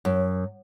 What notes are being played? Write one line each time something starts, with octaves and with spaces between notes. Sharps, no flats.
F#2